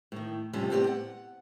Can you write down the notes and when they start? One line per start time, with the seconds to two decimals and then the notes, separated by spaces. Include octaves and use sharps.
0.12 A2 D#3
0.53 F2 A2 C3 F3 G3 C#4
0.70 A2 B3 C4 G4 C5 D5
0.87 F#5